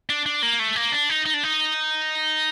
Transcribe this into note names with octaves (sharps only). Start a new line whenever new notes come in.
D4
D4
A#3
A3
A#3
D4
D#4
D#4
D4
D#4